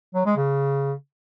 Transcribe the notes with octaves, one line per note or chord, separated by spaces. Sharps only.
F#3
G#3
C#3